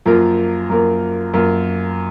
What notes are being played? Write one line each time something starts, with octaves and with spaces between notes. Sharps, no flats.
F#2 F3 A#3 F4 A#4
F#2 F3 A#3 F4 A#4
F#2 F3 A#3 F4 A#4